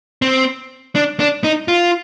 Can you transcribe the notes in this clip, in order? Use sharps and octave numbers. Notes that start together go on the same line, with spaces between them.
C4
D4
D4
D#4
F4